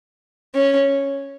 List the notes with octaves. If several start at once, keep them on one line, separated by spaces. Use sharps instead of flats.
C#4